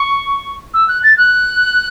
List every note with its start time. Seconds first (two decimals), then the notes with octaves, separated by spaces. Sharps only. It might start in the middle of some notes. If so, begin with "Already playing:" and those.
Already playing: C#6
0.74 E6
0.88 F#6
1.03 A6
1.18 F#6